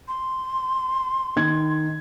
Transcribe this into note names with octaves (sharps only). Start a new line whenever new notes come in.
C6
D#3 G#6